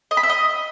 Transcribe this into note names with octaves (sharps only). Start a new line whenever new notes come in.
D#5
B5
E5
D#5